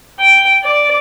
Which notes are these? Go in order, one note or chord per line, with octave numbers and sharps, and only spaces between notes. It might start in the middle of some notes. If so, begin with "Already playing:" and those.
G5
D5